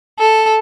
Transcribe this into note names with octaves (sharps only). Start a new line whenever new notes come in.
A4